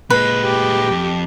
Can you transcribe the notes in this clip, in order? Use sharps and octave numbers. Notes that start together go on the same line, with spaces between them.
A#2 G#3 B4
G4
F2